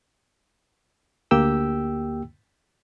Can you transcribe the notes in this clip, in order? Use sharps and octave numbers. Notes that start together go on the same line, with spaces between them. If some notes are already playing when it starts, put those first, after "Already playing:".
D2 A#3 G4 G5 E6